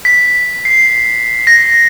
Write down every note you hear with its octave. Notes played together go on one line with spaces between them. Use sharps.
B6
C7
A#6